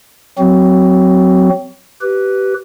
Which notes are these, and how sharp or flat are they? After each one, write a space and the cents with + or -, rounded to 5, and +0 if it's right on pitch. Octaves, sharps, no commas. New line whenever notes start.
F#3 +0 C4 -10 F#4 +25
G4 -20 B4 +0